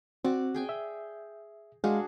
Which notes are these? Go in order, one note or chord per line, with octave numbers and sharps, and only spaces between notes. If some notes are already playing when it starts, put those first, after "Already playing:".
C4 F#4 D5
G#4 G5 G#5
E5
G#3 D4 F#4 G#4 F5